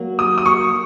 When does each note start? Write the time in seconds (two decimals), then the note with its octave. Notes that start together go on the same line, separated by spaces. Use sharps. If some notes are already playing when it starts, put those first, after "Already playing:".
Already playing: F#3 A#3 F#4
0.19 D#6
0.38 D#6
0.46 C#6